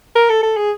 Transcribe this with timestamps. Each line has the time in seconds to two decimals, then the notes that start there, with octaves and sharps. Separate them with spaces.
0.16 A#4
0.30 A4
0.43 A4
0.57 G#4